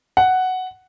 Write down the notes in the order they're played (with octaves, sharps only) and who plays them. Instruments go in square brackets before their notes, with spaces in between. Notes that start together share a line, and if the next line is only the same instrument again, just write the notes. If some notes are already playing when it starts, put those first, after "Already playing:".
[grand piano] F#5